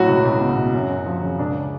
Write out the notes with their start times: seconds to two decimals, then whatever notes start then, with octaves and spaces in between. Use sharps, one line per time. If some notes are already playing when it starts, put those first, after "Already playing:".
Already playing: A2 F#3 F#4
0.08 C#2
0.25 C#2
0.41 B2
0.57 B2
0.74 F#2
0.89 F#2
1.06 F3
1.22 C#3
1.39 C#2 D4